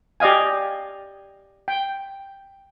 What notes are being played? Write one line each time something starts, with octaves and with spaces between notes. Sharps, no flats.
G4 D5 D#5 F5 G#5
G5